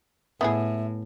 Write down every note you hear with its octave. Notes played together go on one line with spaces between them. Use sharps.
A2 B3 E4 G#4 E5